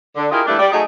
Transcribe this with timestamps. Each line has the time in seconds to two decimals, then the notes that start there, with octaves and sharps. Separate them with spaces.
0.16 D3
0.31 E4 F4 G4 G#4 A#4 D#5
0.47 E3 G3 A3 A#3 D4
0.59 G3 D5
0.72 F#3 A3 D#4 G#4